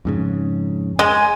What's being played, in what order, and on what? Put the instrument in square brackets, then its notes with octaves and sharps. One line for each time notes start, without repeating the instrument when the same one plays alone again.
[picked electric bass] F2 G#2 C#3
[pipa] G#3 [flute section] G#5